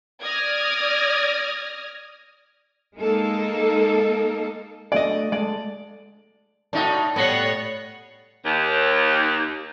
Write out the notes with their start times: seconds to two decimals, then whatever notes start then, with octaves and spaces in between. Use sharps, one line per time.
0.22 D5 D#6 F6 G#6 A#6
2.96 G#3 A#3 D#4 A4
4.92 A3 D4 F#4 D5 D#5
5.32 G#3 A4 D5
6.73 A2 D#4 F#4 D5 A5 A6
7.16 A2 G3 B3 C#5 F#5 A6 A#6 C7
8.45 D#2